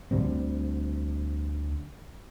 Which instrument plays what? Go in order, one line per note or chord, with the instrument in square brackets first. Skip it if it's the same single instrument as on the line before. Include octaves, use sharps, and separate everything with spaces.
[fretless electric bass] D2 D3 G3 C4